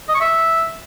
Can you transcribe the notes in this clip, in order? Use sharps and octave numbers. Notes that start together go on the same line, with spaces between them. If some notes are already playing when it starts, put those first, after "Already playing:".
D#5
C#6
E5